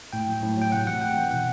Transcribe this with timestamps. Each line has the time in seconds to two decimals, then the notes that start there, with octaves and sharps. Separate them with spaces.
0.13 A2 G5
0.28 F#3
0.42 A2
0.57 F#3 G5
0.72 C3 F#5
0.87 E3 F#5
1.01 C3 G5
1.17 E3
1.31 B2 F#5